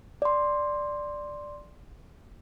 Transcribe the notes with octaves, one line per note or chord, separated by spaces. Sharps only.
D5 C6